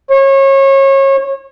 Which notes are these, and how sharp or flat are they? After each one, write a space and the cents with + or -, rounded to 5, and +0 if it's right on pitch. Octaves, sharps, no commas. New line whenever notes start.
C#5 -30